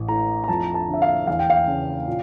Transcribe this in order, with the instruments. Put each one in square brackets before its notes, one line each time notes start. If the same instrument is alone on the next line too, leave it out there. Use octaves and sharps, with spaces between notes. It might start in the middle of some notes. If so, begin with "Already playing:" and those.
Already playing: [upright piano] A1
[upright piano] A2 [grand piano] A#5
[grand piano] A#5
[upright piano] F2 [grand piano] A5
[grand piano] A5
[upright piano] D3
[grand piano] E5
F5
[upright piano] E2 [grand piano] F5
[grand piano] G5
F5
[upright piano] C#3
A#2